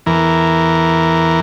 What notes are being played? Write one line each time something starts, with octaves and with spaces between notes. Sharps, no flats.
E2 E3 A#4